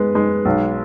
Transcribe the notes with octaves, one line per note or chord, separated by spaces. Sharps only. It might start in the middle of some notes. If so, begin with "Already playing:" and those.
Already playing: G#3 B3 B4
G#3
B1